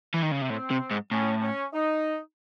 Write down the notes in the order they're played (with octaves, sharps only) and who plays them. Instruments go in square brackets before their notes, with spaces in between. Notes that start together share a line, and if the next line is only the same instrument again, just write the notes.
[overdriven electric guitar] E3
D#3
C#3
C3
[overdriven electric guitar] A2 [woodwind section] C4
[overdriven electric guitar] C3
G#2
[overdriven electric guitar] A2 [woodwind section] C#4
[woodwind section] C#4
D#4